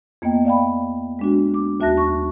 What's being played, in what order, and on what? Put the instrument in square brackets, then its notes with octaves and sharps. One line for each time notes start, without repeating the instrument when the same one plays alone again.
[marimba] F2 A#3 B3 D#5 G5
D5 F5 G5 B5
G#3 D4 F#4
D6
D#2 F#4 E5 A5 F#6 A#6
C#6